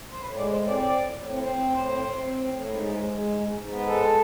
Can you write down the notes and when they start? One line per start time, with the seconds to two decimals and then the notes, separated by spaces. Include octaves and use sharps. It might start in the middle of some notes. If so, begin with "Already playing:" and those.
0.11 C5
0.21 A2 B4
0.36 G#3 D5
0.51 A2 C5
0.68 C4 D5
0.82 A2 D5
0.97 A2
1.13 A2
1.28 C4
1.43 C4 C5
1.59 A2
1.73 A2 C5
1.89 C4
2.04 C4
2.18 C4
2.34 A2
2.49 A2
2.64 G#2
2.80 G#3
2.95 G#3
3.09 G#3
3.25 G#2
3.40 G#2
3.55 G#2
3.71 B3
3.85 G#3 A4